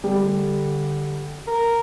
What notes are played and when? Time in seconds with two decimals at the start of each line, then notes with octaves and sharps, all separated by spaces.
0.04 D3 G3
1.47 A#4